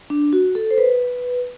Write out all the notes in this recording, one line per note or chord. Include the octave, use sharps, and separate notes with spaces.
D4
F#4
A4
C5
B4